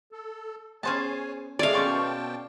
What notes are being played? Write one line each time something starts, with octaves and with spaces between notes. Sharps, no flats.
A4
B3 C#4 G#4 C5 C#5 G#5 A5
F2 C3 G#3 A3 C#5 D5 F5
B2 A#3 C#4 C#5 G5 A5 C6 C#6